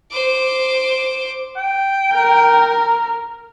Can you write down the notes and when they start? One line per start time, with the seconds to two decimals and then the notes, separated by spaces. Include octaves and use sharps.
0.11 C5 D6
1.57 G5
2.12 A#4